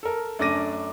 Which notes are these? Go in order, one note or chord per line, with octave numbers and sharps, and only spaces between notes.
A4 A#4
F#2 A3 D4 D6 A#6 D#7